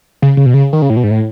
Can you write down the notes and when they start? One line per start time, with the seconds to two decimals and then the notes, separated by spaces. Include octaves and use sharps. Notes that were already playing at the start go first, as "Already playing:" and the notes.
0.22 C#3
0.37 C#3
0.46 B2
0.54 C#3
0.73 D#3
0.82 C#3
0.90 A2
0.97 B2
1.04 G#2
1.11 A2